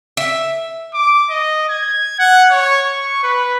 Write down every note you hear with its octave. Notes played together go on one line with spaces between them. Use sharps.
E5
D6
D#5
G#6
F#5
C#5
C#6
B4